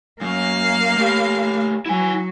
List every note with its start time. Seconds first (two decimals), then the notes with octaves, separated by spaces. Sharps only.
0.21 F#2 A#3 F5
0.96 A3 G4
1.86 F#3 E4 G#5